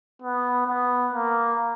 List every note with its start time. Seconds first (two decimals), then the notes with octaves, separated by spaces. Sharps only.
0.22 B3
0.67 B3
1.13 A#3